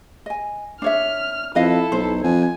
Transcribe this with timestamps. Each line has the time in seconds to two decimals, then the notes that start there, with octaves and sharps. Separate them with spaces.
0.26 D#5 G#5
0.82 D4 C#5 E5 F6
1.55 F2 E4 A4 B4 D#5 F5
1.92 B1 C5
2.23 F2 G#5